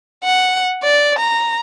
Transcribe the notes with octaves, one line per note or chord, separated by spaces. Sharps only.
F#5
D5
A#5